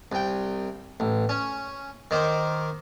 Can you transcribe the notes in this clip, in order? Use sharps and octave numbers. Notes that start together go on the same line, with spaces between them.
C2 G5
A1
C#4
D#3 C5 D6